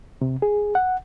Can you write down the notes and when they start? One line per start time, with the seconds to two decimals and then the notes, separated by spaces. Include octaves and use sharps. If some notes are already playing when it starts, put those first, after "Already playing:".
0.22 C3
0.42 G#4
0.75 F#5